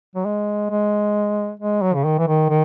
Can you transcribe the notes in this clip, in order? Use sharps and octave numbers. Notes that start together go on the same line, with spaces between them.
F#3
G#3
G#3
G#3
F#3
C#3
D#3
E3
D#3
D#3